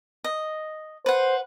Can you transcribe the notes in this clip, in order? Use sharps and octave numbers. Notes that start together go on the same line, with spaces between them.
D#5
B4 C5 F#5